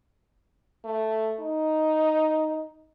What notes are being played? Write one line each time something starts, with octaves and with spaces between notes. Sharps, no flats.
A3
D#4